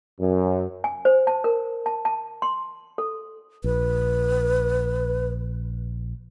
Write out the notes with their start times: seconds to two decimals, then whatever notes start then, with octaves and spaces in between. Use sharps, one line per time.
0.20 F#2
0.84 G#5
1.05 C5
1.27 A5
1.44 A#4
1.86 A5
2.05 A5
2.42 C6
2.98 A4
3.64 A#1 B4